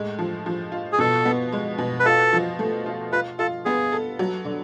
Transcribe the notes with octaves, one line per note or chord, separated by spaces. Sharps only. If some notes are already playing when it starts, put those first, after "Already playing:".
Already playing: A2 G#3
F3
F3
F4
G#4
B2 A4
B3
G#3
B2
B4
F4 A4
F3
A3
F4
F4 B4
F4 A4
B3 G#4
A4
F#3
D3